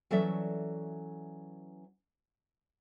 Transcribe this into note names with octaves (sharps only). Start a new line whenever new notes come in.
E3 F#3 C#4 A4 D5 E5